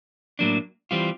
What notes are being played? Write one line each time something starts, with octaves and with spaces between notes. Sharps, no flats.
A2 F#3 A#3 D4
E3 G3 C4 F4